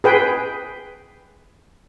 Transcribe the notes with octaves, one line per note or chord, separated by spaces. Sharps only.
G#4 B4 G5